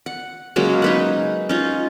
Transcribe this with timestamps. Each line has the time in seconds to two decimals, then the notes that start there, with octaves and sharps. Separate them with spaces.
0.06 F#5
0.56 C#3 F#3 G#3 A#3
0.82 D#4 B4 F#5
1.49 C#4 D#4 F4